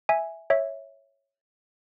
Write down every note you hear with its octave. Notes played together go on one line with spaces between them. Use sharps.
E5 G#5
C#5 E5